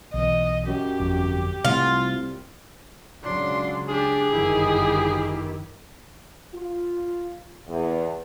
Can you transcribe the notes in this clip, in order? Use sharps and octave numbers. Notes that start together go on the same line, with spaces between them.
B1 E3 D#5
F#2 G4
G1 F2
C2 C3 G3 A3 F4
C#2 C#3 F#3 D4 C6
D4 G4 G#4
G1 F#2 D#3 E4 G4
F4
E2